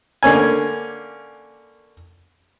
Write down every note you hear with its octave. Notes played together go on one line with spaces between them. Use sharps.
D3 A#3 C#4 G#5